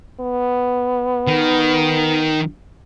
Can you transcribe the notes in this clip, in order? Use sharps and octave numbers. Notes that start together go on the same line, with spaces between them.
B3
D#3